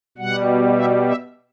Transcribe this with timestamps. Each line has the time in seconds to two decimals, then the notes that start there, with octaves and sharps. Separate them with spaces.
0.18 B2 G3 F#5
0.76 E5
1.07 E5